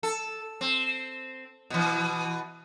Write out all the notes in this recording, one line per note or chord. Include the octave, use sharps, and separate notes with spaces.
A4
C4
B2 E3